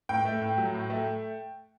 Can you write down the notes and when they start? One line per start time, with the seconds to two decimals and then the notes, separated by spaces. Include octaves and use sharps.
0.09 A2 G5
0.25 A3
0.41 A2
0.58 F#3
0.74 A2
0.90 A3